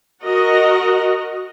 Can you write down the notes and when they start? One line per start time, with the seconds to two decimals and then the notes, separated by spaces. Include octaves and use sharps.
0.22 F#4 A#4 D#5